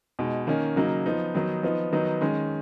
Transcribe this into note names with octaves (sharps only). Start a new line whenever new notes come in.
B2 G#3 D#4
D#3 A#3 C#4
C#3 F#3 A#3 D#4
F3 B3 D#4
D#3 F#3 B3 D#4
F3 B3 D#4
D#3 F#3 B3 D#4
D#3 G#3 C#4